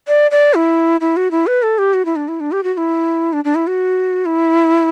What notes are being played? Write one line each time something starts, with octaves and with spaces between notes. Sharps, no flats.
D5
D5
E4
E4
F#4
E4
B4
A4
G4
F#4
E4
D4
E4
D4
G4
F#4
F#4
E4
D4
D4
E4
F#4
E4